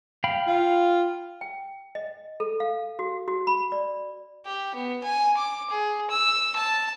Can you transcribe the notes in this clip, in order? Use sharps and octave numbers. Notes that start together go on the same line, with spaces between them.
F5 G5 B5
F4
G5
D#5
A4
F5
F#4
F#4
B5
D5
G4
B3
G#5
D6
G#4
E6
A5